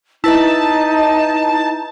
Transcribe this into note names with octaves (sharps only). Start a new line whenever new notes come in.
D#4 E4 B4 E5 A5